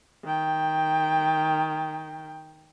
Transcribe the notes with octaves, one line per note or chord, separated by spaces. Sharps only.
D#3 G5